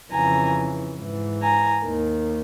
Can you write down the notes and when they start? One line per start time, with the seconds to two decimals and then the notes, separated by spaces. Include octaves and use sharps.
0.11 F2 C#3 E3 G#5 A#5
0.99 G#2 E3
1.42 G#5 A#5
1.85 D#2 D#3